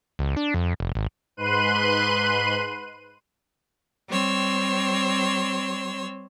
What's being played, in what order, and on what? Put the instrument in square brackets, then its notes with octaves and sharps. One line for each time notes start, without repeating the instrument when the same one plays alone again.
[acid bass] C#2
D4
F2
F1
G#1
[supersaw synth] G#2 B4 C6 F#6 D#7
[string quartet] G3 C4 C#5 C6 E6